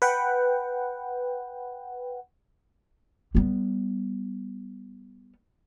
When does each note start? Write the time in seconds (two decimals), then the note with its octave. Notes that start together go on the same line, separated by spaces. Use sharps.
0.02 B4 F#5 G5
3.35 G3 B3